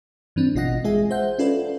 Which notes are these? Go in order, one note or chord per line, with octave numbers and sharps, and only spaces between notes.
G2 E3 C4 D4
A1 B2 F4 D#5 F#5 A#6
G#3 F4 G#4 E5 G#5
C5 E5 F#5 G6
C#4 F4 A4 B4 D5